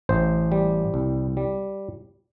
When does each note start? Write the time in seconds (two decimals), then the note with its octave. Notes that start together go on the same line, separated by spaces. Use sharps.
0.09 A1 C5
0.52 G3
0.94 C2
1.37 G3